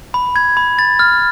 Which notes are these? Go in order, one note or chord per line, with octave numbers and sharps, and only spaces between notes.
B5
G#6
B5
A6
F6